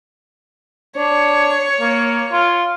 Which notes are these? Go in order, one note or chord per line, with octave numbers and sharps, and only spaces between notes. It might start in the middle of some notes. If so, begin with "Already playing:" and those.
D4 C#5
A#3
F4